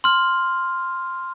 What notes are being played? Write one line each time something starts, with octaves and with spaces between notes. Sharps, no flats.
C6 F6